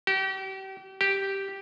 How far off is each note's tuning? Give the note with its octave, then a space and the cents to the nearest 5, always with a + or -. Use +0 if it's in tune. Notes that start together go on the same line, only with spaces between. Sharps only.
G4 -35
G4 -5